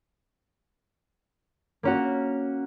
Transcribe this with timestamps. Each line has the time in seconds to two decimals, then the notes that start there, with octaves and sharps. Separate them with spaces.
1.83 A#3 C#4 F#4